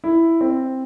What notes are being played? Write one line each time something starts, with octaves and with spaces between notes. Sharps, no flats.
E4
C4